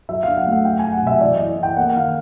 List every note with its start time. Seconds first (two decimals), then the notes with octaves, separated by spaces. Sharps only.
0.09 F#3 E5
0.23 F5
0.28 D4
0.37 F#5
0.46 A3
0.51 F#5
0.65 F#3 G5
0.79 F#3 G#5
0.93 F#5
1.02 C3 E5
1.21 E3 D5
1.35 E4 D#5
1.58 E3 G5
1.77 A#3 F#5
1.96 D#3 F5